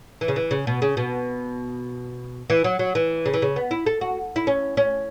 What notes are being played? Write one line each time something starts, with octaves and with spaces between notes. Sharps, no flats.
E3
C#3
E3
C#3
B2
C#3
B2
E3
F#3
F#3
E3
C#3
E3
C#3
B3
E4
A4
F#4
E4
C#4
C#4